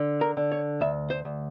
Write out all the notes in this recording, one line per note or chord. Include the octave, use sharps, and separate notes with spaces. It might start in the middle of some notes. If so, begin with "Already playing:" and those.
Already playing: D3
A#4
D3
C#5
D2 E5
C5
D2